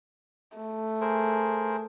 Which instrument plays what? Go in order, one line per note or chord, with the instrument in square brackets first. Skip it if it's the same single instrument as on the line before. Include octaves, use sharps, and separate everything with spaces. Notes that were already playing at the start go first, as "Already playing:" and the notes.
[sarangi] A3
[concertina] G#4 A#4 C5